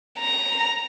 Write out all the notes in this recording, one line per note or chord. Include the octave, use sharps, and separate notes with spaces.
A#5